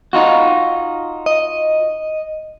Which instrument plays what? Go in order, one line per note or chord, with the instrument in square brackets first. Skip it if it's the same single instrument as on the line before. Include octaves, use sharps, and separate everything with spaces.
[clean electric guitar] D#4 F4 F#4
[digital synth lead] D#5